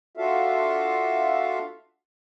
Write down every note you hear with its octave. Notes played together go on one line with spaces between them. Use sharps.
D4 F4 F#4 A4 E5 F5